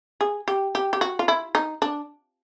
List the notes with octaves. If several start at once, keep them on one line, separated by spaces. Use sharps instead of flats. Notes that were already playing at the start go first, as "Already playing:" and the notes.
G#4
G4
G4
G4
F#4
F4
E4
D#4
D4